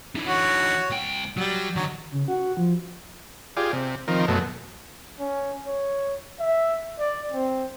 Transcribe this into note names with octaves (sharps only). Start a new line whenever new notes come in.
D3 E3
F#4 C#5
C2 G5
F#3 G3
D3 D#3 F#3
C#3
F#4
F3
F4 G4 G#4 D5
C3
D#3 F3 C4 A#4
F#2 B2 A3
C#4
C#5
E5
D5
C4